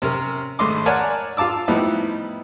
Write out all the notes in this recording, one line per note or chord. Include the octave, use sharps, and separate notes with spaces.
C3 C#4 A#4
G#1 A3 D#5 C6 D6
A#4 C#5 D5 F#5 G#5 A5
F4 F5 A5 D6 E6
A2 F3 G3 B3 D#4 E4